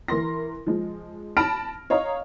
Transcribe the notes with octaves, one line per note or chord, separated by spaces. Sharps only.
E3 A#4 C6 A#6
F3 G#3
A5 B5 F6 A#6 D7
C#5 D#5 F5 A#5